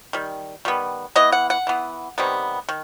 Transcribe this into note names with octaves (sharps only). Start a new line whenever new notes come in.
D#3 G3
D#3 G3 B3
E3 B3 D#5
F#5
F#5
E3 B3
C3 D#3 G3 B3
D#3